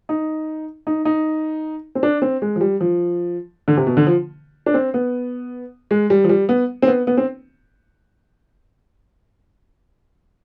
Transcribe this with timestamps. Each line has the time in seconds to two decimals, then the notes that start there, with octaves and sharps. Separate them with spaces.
0.09 D#4
0.87 D#4
1.05 D#4
1.95 C4
2.03 D4
2.22 C4
2.42 G#3
2.56 F3
2.61 G3
2.80 F3
3.68 D3
3.77 C3
3.87 B2
3.97 D3
4.07 F3
4.66 D4
4.74 C4
4.94 B3
5.91 G#3
6.10 G3
6.24 F3
6.29 G3
6.49 B3
6.82 C4
6.87 B3
7.07 B3
7.17 C4